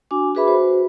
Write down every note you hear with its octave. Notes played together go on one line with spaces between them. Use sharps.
D4 F#4 G#5 D6
F#4 G#4 B4 E5 B5
F#4 C5